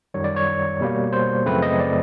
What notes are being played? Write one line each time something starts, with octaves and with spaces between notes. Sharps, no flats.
F#2 D#3 G3 C#5
D5
C#5
B2 G3 A#3
C5
F#2 C#3 F3 A3 C4 B4
D#5
D5